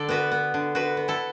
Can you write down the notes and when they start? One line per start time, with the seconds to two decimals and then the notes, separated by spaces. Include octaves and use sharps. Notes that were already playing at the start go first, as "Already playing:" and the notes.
Already playing: D3 A4 D5
0.09 B3 F#4 B4
0.32 B3
0.54 D3
0.75 D3 F#4 B4
0.97 B3
1.08 E4 A4